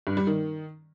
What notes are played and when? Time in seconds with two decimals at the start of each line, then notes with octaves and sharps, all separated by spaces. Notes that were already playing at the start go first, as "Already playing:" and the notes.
0.07 G2
0.17 G3
0.27 D#3